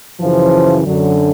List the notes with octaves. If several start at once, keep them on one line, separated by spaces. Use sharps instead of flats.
F#2 C#3 E3 F3
F#2 D3 F#3